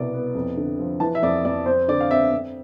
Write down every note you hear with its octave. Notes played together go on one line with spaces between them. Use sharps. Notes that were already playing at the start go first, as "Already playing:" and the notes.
Already playing: C2 B2 D5
B3
F2
D3
F3
E3 A5
E5
F2 D5
F2 D5
C4 C5
D3 D5
F5
C4 E5
C4